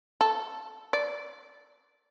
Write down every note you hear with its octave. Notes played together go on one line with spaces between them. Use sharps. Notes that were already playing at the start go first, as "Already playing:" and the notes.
A4
D5